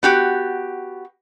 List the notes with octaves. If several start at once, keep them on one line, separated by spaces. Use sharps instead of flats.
B3 F#4 G4